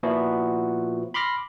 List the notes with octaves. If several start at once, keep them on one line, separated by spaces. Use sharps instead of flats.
A#2 F3 B3 E4 F#4
B5 C6 D6 F6 A#6